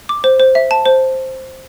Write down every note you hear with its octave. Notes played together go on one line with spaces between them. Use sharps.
D6
C5
C5
E5
A5
C5